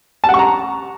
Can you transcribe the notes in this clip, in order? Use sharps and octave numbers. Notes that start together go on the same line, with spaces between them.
A5
F#5
C#6
A#5